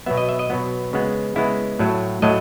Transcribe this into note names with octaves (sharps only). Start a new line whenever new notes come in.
B2 F#3 B3 E5
D#5
E5
D#5
B2 F#3 B3
C#3 G#3 B3
C#3 G#3 B3 E4
A2 F#3 A3
A2 F#3 A3 D#5